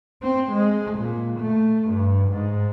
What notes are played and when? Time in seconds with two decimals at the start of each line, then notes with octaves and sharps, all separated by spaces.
0.23 C4
0.53 G#3
0.99 A#2
1.41 A3
1.89 G2
2.29 G#2